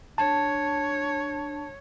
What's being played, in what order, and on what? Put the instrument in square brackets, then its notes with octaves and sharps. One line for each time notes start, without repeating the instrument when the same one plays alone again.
[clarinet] D4 [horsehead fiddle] C#5 [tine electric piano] A5